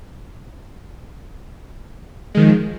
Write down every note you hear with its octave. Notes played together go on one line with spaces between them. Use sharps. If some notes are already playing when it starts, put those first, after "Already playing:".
D#3 F3 G#3